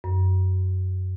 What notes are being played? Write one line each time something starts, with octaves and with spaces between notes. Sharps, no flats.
F#2